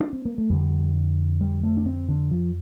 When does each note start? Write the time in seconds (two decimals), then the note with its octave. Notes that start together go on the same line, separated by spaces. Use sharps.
0.00 D4
0.13 C4
0.25 A#3
0.38 A3
0.50 F2 D3 G3
1.41 G3
1.63 A3
1.77 D4
1.86 C4
2.09 D3
2.31 F3